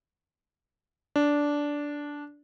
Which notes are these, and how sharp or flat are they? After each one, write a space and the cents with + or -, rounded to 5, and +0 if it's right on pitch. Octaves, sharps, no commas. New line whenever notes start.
D4 -10